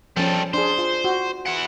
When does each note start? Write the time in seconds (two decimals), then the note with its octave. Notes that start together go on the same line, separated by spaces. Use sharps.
0.17 F3 G3 C#4 A4
0.54 D4 G#4 C5
0.78 F4
1.04 F#4
1.47 E4 F#5